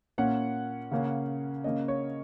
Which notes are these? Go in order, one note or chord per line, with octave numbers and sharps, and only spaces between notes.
A#2 A#3 C#4 F#5
C#3 A#3 C#4
C#3 A#3 C#4 D#5
C#5